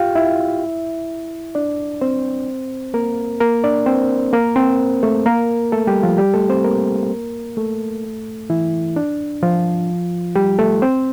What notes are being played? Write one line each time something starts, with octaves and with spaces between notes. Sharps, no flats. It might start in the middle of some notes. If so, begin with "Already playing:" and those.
Already playing: F4 G4 F5 G5
E4 E5
D4 D5
C4 C5
A#3 A#4
A#3 A#4
D4 D5
C4 C5
A#3 A#4
C4 C5
A3 A4
A#3 A#4
A3 A4
G3 G4
F3 F4
G3 G4
A3 A4
C4 C5
A#3 A#4
A3 A4
E3 E4
D4
F3 F4
G3 G4
A3 A4
C4 C5